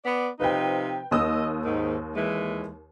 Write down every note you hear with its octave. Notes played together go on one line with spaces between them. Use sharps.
B3 D5
C3 F3 D#4 B4 G5
D#2 D#5 D#6 E6
G#2 D#3
E3 G#3